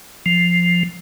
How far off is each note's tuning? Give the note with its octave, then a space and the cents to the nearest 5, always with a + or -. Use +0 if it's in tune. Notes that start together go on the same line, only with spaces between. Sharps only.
F3 +5